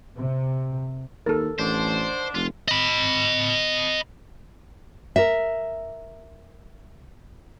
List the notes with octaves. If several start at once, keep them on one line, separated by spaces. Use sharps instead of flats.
C3
D#2 A4 A#4
A1 D3 D#3 D4 C5
F1 F4
D#5 B5
A#4 E5